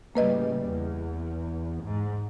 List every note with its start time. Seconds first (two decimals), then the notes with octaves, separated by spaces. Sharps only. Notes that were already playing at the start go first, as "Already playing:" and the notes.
0.15 A2 C#3 G3 A#3 B4 D#5
0.68 E2
1.83 G#2